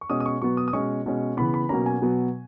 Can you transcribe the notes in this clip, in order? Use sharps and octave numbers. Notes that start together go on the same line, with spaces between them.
C#6
B2 G#3 C#4 D#6
D#6
C#6
B2 F#3 B3 C#6
D#6
D#6
B2 G#3 C#4 C#6
B2 G#3 C#4
C#3 E3 B3 B5
B5
B2 F#3 A#3 C#4 A#5
G#5
B2 F#3 B3